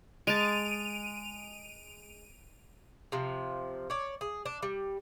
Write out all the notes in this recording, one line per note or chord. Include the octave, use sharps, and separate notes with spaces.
G#3 A5 D7 D#7 F7
C3 F3
C#5 D5
G#4
D4
G3